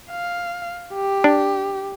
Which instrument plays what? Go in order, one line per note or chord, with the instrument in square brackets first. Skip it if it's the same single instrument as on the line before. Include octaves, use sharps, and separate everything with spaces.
[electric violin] F5
G4
[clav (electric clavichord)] D4